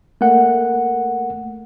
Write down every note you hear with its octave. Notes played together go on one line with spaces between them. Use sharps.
A3 A#3 A#4 F#5